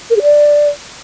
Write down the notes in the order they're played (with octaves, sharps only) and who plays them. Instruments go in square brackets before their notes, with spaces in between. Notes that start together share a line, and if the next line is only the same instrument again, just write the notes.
[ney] A#4
G#4
D5